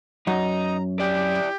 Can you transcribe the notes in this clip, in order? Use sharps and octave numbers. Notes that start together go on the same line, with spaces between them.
F#2 D#4 A#5
E4 G4 D5